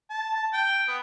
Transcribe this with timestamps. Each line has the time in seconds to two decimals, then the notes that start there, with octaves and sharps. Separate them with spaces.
0.10 A5
0.35 A5
0.53 G5
0.88 B3